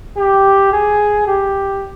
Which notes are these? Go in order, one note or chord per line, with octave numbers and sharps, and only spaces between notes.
G4
G#4
G4